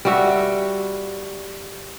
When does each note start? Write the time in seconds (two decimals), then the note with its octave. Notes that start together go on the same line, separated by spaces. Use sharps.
0.05 G3 F#4 E5